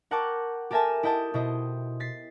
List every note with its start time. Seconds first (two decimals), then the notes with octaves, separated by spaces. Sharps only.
0.11 A#4 F#5 G5 A5 C#6 D6
0.71 G4 A4 A#4 E5 G#5 A5
1.03 E4 D#5 G5 A5
1.34 B2 E4 C5 D#5
2.00 A6 B6 C7